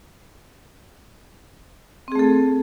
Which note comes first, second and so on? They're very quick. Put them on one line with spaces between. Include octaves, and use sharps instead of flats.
C4 G#4 A3 A4